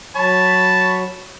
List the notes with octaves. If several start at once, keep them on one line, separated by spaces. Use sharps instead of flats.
F#3 C#5 A5 B5